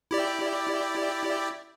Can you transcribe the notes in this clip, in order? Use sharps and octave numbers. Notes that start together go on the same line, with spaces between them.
E4 G4 D5